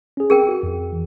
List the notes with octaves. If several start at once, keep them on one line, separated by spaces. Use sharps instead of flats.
C#4 G#4
C4 G#4 A#4 G5
F#4
F2
E3